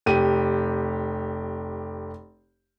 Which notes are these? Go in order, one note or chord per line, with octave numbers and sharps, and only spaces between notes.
F1 G4 D#7